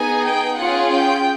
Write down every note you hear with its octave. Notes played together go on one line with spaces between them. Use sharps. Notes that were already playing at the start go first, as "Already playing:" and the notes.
Already playing: B3 D#4 G#4 G#5
G5
C#4 F4 G#4 F#5
G5